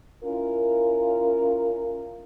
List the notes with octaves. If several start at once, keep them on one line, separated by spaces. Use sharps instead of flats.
C#4 E4 F4 A#4